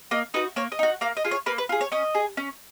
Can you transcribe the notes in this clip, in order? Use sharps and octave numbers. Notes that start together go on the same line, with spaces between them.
A#3 D#5
D#4 F#4 B4
A#3 C#5
D#5
D#4 F#4
A#3 F5
D#5
F4 G#4
C#5
A#3 B4
B4
F4 G#4
C#5
C#4 D#5
G#4
C#4